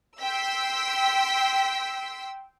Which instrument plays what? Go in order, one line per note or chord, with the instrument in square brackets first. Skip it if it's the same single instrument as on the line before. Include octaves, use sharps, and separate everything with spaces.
[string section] G5 C6 E6 B6